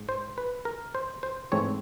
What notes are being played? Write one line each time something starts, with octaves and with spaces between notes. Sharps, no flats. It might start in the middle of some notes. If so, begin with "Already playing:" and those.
Already playing: G#2
C5
B4
A#4
C5
C5
G#2 E3 A3 C4 C#5